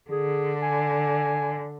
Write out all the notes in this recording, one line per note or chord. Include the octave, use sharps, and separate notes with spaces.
D3 G#4
G#5